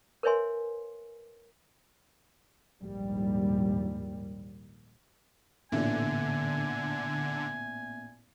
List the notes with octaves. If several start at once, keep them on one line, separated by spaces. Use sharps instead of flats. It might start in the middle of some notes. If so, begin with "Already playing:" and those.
A#4 B4 C#5 E5 G#5 C6
A#1 D#2 G#2 G3
A1 A#2 D3 B3 E5 G#5